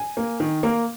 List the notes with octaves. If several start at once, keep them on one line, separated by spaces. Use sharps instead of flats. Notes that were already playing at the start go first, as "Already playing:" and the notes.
Already playing: G#5
A#3
D#3
A#3